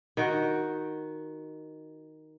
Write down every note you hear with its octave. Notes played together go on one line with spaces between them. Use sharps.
D#3 F#4